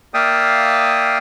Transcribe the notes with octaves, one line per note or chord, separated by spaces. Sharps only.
A#3 D5 E5 F5 G5 D#6